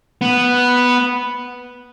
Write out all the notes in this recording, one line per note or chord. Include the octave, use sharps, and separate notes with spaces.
B3